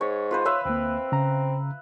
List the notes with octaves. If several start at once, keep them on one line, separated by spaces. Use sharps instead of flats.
G#2 C#5
F4 B4 C5
B4 C#5 E5 F5
D2 A#3 C4
C#3 A#5